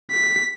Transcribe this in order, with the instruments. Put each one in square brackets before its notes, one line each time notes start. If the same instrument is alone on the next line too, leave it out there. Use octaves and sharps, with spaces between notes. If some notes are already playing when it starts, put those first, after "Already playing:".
[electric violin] B6